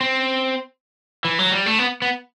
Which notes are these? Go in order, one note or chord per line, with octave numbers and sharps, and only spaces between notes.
C4
E3
F#3
G3
A3
B3
B3